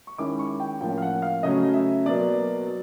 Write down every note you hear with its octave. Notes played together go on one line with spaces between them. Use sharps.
C#6
D#3 G#3 C#4 E4 D6
C#6
G5
A2 F3 A#3 C#4 G5
F5
F#5
F5
C#3 F#3 A3 C#4 D#5
E5
B2 F#3 A#3 D5
F#3